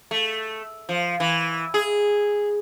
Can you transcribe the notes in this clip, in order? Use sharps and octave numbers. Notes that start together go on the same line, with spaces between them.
A3
F3
E3
G#4